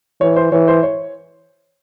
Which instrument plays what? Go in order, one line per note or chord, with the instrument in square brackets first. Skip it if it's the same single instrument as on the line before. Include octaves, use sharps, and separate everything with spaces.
[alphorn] E3 [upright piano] C#5
[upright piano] C5
[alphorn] E3 [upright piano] C#5
[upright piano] C5
C#5